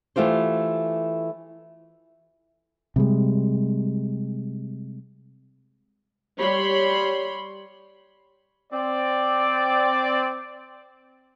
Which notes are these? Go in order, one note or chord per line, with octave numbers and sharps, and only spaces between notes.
E3 A3 F4 G4 C5
C3 G3 G#3
G3 C#5 B5 C6
C4 D5